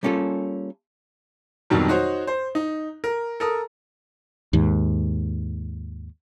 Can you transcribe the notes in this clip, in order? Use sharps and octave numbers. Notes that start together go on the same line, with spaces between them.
G3 A#3 C#4 F4 A4
F2 B2 D#3 F#3 G3
D#4 F#4 C5 C#5
C5
D#4
A#4
A4 A#4 D#6
D#2 G#2